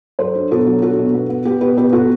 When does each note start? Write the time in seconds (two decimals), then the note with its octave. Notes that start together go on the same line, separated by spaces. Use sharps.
0.19 F#3 A4 C5
0.35 D4
0.51 B2 F#4 A4
0.67 F#3
0.82 D4 F#4 A4
0.99 B2
1.14 B3
1.29 B3
1.45 B3 G4
1.61 B2 G4 B4
1.77 B2 G4 B4
1.92 B3 F#4 A4